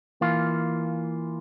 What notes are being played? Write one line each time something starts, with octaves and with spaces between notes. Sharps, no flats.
E3 A#3 F4